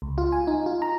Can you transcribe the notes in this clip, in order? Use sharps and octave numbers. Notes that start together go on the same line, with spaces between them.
C#2
F4
G#5
D#4
F4
A#5